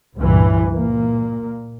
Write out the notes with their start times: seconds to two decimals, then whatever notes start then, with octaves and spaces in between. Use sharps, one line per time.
0.15 C#2 G2 A#2 E3
0.74 A#2 A#3